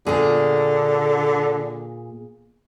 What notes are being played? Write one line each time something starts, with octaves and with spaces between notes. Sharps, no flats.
A#2 D3 G#4